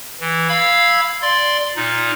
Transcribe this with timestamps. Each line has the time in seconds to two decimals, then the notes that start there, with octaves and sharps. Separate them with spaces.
0.20 E3
0.49 F5 B5 E6 G#6
1.22 D5 C6
1.76 A#2 D#4